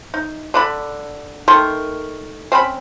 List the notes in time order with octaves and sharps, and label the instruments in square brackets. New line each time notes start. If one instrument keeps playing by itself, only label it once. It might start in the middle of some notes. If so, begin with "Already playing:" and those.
[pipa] D#4
D3 D4 B5
D#3 A3 A#4 C6
C4 C#4 B4 B5